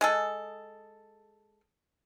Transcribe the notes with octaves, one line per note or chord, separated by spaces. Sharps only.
G#3 G#4 A4